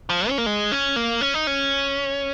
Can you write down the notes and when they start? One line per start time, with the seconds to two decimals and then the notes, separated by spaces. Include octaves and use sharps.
0.09 F3
0.29 C#4
0.38 A#3
0.46 G#3
0.72 C#4
0.96 A#3
1.21 C#4
1.34 D#4
1.47 C#4